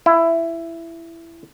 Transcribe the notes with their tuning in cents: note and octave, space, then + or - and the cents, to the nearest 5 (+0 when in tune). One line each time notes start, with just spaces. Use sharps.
E4 +15